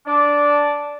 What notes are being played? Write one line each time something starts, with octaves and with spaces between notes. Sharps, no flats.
D4 D5